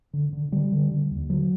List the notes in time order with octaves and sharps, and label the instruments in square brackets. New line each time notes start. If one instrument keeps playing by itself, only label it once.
[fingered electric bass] D3
D3
D3 G3
D3
D3
D#2
D3 F#3